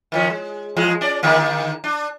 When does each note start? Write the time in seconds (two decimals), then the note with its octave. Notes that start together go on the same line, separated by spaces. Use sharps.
0.12 D#3 F3 C#4
0.30 G#3
0.77 E2 F3 G#3
1.01 C#4 D5
1.23 D3 D#3 A#3
1.84 D4